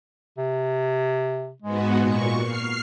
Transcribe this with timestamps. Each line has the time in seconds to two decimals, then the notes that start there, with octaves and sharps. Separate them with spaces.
0.38 C3
1.62 G#2 G#3 B3 F#4
1.99 A#2 C#6
2.41 F6 C7